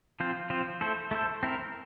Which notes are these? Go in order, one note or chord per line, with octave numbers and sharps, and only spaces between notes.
F3 C4 F4 C5
F3 C4 F4 C5
A3 E4 A4 C5
A3 E4 A4 C5
C4 E4 A#4